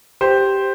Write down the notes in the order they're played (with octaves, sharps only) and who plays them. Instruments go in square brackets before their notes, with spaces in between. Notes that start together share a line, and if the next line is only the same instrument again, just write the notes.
[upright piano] G4 C5